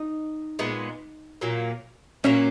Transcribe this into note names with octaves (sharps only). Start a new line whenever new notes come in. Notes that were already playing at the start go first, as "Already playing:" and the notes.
Already playing: D#4
A#2 G#3 B3
A#2 F#3 A#3
A#2 F#3 A#3 C#4